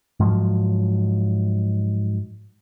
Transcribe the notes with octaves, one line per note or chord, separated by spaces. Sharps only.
G#2 F3 F#3